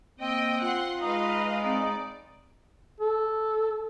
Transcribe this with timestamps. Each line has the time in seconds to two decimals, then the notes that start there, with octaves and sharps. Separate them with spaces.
0.20 A#3 C4 D#5 G5
0.62 F4 F#5 C6
1.02 G#3 D#4 B4 D#5 F5
1.63 C4 D#4 D5
3.01 A4